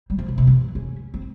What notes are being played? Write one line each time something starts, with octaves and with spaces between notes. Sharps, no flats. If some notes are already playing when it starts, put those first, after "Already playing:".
G3
F3
C#3
C3
E3
C#4
C4